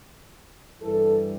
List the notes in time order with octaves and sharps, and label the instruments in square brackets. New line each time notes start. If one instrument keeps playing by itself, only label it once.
[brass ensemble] G2 E3 G3 A4